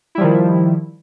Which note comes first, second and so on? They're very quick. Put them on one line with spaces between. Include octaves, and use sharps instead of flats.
E4 G3 F3 D#3